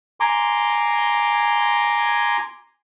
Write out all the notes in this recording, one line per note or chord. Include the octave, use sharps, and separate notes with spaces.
G#5 A#5 C6 D6